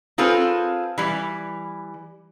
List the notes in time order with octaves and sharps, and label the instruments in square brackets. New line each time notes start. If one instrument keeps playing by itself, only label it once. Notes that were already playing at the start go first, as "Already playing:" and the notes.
[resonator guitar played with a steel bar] C4 F4 G#4 A4 B4
E3 G3